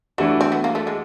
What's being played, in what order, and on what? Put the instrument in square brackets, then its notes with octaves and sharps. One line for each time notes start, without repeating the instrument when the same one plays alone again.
[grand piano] E3 A3 D4 F#4 [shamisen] G3
[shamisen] C4
B3
A#3
A3
G#3